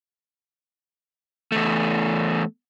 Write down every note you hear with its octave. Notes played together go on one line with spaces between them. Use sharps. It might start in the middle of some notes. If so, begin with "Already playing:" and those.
E2 A3